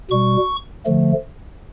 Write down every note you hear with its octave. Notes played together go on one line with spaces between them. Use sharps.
B2 G3 C#6
D3 F3 A3